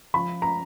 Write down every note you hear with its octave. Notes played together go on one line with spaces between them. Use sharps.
F3 B5
A#5